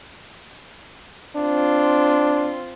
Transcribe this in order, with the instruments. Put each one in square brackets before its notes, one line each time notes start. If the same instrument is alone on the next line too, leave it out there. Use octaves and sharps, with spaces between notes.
[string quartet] C4 F4 [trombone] D4